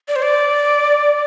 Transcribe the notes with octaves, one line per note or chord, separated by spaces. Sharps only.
D5
C5
D5